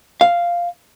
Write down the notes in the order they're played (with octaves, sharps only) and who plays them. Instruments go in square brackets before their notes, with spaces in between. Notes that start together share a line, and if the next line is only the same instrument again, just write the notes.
[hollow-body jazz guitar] F5